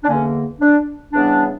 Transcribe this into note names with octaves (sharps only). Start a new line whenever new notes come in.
D4
E2 D3 A#3 C#4
D4
C#3 E3 G3 B3 D4